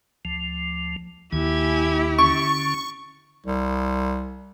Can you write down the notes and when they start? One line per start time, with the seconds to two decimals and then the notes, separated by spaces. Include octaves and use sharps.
0.25 D2 F3
1.33 D#2 E4 G4 G#5
2.19 D3 C#4 C#6
3.47 C2